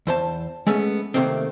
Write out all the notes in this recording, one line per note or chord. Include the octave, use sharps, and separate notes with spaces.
E2 C5 A5
G#3 A3 B3 C#4
C3 D#3 A3 A#3 C4